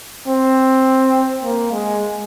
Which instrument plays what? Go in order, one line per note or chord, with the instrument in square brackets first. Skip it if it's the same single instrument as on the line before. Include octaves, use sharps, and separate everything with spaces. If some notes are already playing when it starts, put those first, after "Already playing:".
[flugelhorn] C4
A#3
G#3